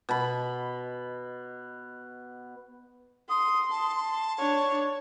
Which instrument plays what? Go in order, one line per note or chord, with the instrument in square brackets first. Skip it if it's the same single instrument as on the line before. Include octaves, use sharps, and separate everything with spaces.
[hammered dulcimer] B2 B5
[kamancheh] C6 [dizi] D#6
[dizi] A5
[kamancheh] D4 C#5